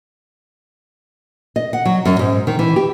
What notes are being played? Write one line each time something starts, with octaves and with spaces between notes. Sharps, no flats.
D#5
F#5
F#3
F#2
G#2
D#3
E3
G4